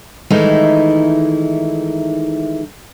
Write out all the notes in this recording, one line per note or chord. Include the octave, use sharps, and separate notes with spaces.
D#3 E3 G#3 A3 D#4 E4